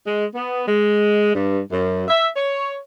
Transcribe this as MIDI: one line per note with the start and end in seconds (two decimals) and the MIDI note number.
0.07 0.25 56
0.35 0.63 59
0.68 1.35 56
1.35 1.60 43
1.72 2.05 42
2.08 2.27 76
2.36 2.78 73